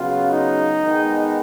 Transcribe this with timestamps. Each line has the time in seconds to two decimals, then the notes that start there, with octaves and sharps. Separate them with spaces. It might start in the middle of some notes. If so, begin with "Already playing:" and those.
Already playing: C#3 F#3 B3 F4
0.31 D#4
0.83 D#3 G#3 B3